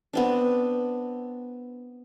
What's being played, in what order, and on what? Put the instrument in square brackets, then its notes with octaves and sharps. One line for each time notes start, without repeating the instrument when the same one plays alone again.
[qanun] B3 C4 D4